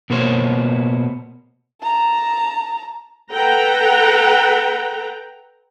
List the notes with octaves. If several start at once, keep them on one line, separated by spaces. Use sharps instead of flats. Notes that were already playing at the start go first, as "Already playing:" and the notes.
B2 A#3 B3 C5 C#5
A5 A#5
A4 B4 F#5 G5 A#5